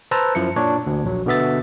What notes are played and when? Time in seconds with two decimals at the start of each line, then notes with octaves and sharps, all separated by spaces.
0.11 B4 C5 A5 A#5 E6
0.35 F#2 F3 E4 C#7
0.56 A#2 D4 C#5
0.87 D2
1.04 A#1 F#3
1.26 B2 D3 B3 E5 A6